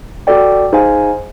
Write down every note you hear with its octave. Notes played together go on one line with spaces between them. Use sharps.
F#4 A4 D5 G5
D#4 G#4 C5 F5 G#5